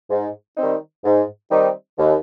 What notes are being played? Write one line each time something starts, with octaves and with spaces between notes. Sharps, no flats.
G#2
D#3 G3 C4 D#4
G#2
D#3 G3 C4 D#4
D#2